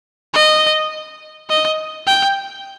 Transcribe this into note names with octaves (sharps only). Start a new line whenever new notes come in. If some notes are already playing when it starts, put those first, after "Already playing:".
D#5
D#5
G5